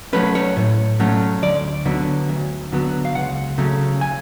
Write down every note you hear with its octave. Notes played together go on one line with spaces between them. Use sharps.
F#3 A3 C#4 B4
C#5
A2
F#3 A3 C#4
D2 D5
D3 F#3 B3
D2
D3 F#3 B3
F5
C#2 F#5
C#3 F#3 A3 C#4
G#5